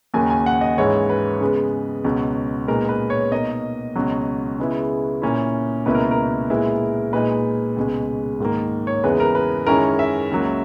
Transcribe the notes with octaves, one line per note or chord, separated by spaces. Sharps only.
D#2 C#3 F#3 A#3 G#5
G#5
F#5
D#5
G#2 E3 G#3 C#4 E4 C#5
B4
C#3 G#3 B3
C#2 B2 F#3
A#2 G#3 B3 D#4 A#4
B4
C#5
B2 A#3 D#4 D#5
C#2 B2 F#3
C#3 G#3 B3 E4
A#2 A#3 C#4 E4
C#2 B2 A#3 E4 B4
A#4
A#4
A#2 G#3 B3 E4
A#2 G#3 D#4 B4
C#2 B2 G#3
G#2 D#3 A#3
C#5
E2 C#3 E3 G#3 B3 B4
A#4
B4
F#2 D#3 G#3 C#4 E4 A#4
E5
C#2 C#3 F#3 A#3